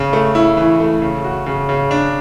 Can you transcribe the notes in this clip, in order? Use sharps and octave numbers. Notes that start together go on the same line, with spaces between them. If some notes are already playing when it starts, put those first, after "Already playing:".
Already playing: C#3
A3
E4
E3
A3
C#3
F#4
C#3
C#3
D4